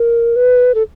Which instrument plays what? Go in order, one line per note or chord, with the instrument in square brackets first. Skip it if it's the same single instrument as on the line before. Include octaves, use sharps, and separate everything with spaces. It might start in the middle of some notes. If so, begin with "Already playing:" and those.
Already playing: [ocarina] A#4
B4
A4